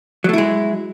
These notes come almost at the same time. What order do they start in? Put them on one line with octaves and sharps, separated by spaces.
F#3 A3 E4 G#3